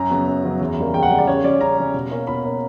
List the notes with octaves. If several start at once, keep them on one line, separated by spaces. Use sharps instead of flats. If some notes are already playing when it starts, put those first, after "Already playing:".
Already playing: F#2 A#5
C#3 F#3 B3
F#2
C#3 F#3 B3
E2
C#3 G3 A#3
E2 G5
F#5
C#3 G3 A#3
D5
C#3 C#5
G3 C#4 D5
C#3 A#5
G3 C#4
B2
A#3 C#4
B2 B5
A#3 C#4